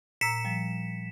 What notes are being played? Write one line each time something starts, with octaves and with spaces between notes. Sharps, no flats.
A#2 A#5 E6 B6 C#7 E7
F3 G3